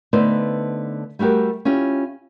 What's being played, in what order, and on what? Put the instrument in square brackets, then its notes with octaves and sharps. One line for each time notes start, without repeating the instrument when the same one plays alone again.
[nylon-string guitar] D3 A3 B3 D#4 B4 C5
G3 A3 F#4 G4 A#4
C#4 E4 F4 G4